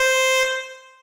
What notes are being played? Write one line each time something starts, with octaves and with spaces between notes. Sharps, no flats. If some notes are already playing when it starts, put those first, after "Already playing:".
Already playing: C5